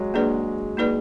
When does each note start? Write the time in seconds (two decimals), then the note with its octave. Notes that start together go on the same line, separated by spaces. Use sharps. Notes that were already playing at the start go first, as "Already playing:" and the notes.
Already playing: F#3 G#3
0.14 G#3 A#3 D4 G#4 B4 D5
0.77 A#3 D#4 G#4 B4 D5